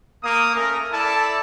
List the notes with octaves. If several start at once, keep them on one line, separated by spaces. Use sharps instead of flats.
A#3 D#6
A3 C#4 A#4
E4 A4 D5 A5